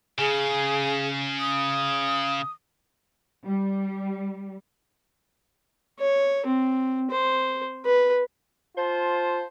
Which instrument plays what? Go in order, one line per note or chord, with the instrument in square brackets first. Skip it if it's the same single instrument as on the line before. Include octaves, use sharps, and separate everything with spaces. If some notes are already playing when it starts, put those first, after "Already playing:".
[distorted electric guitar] C#3 [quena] G#4
[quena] D#6
[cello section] G3
[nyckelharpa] C#5
C4
C5
B4
[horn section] F4 C5 A5